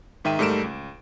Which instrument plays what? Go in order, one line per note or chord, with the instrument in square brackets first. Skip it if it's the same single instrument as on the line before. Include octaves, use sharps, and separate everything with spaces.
[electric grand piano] G#2 D#3 E5 G5 D#7
G#2 G3 A3 A#4 D7 E7
C#2